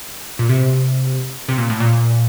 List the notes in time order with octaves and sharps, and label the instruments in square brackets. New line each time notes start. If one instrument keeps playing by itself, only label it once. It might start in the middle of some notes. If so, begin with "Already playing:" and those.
[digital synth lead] A#2
C3
C3
A#2
A2
A#2